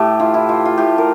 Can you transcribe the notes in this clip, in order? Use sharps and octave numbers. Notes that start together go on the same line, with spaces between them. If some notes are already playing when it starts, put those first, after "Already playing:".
Already playing: A2 A3 G4 A4
E3 F4
E4
E3 F4
F4
A2 G4
A#4